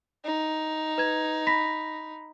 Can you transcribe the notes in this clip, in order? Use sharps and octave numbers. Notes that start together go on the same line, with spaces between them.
D#4
B4 G#6
B5 A#6 B6